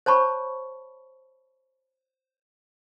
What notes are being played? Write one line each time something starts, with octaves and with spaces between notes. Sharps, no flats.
C5 C#5 A5 B5 C#6